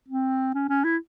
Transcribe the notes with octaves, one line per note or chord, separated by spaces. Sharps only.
C4
C#4
C#4
E4